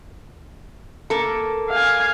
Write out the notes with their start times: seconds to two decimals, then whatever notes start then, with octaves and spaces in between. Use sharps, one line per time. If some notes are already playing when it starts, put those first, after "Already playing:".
1.10 A#3 A4
1.70 F5 G#5